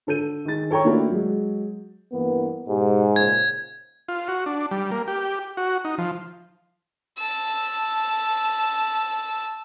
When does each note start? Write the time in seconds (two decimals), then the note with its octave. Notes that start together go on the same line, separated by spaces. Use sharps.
0.07 D3 A4 G6 D#7
0.45 D#3 G#4 A6
0.71 A4 C#5 G5 A#5 C#6
0.84 A3 A#3 D4 E4 F#4
1.10 F#3 G#3
2.12 G2 E3 A#3 B3
2.69 G#2 B2 G4
3.16 A#2 C#3 F3 G#6
4.08 F4
4.28 F#4
4.46 D4
4.71 G3
4.91 A#3
5.08 G4
5.57 F#4
5.85 D#4
5.98 F3
7.18 A5 E6